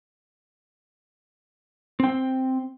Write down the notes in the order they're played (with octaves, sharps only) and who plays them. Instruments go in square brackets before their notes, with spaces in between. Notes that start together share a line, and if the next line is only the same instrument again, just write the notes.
[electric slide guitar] C4 G5